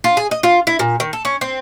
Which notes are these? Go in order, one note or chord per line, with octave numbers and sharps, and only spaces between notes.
F4
G#4
D#5
F4
E4
A#2
D#3
A4
C#4
C4